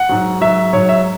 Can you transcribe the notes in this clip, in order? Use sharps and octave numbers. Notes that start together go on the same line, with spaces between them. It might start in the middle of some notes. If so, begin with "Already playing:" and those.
Already playing: F#5
G#2 F#3
G#2 F#3 E5
G#2 F#3 C#5
E5